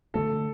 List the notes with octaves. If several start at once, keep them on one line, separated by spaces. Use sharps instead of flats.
D3 F#3 A3 D4 A4